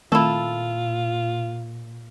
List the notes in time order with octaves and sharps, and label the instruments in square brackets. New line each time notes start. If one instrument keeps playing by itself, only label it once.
[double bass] A#2 [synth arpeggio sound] D#3 A3 C4 [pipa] E4 A4 [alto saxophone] F4